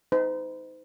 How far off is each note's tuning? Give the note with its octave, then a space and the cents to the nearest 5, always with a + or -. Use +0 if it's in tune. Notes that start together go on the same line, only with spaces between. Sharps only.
D#4 +20 C5 -40